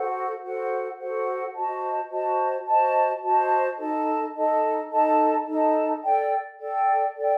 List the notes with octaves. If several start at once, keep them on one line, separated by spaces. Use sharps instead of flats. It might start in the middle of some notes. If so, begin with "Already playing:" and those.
Already playing: F#4 A4 C5 F#5
F#4 A4 C5 F#5
F#4 A4 C5 F#5
F#4 C5 D#5 A5
F#4 C5 D#5 A5
F#4 C5 D#5 A5
F#4 C5 D#5 A5
D#4 A4 D#5 A5
D#4 A4 D#5 A5
D#4 A4 D#5 A5
D#4 A4 D#5 A5
A4 D5 G5
A4 D5 G5
A4 D5 G5